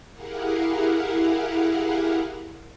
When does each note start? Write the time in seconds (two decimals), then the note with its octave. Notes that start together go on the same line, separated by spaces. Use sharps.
0.12 E4 G4 G#4 A#4 F5 F#5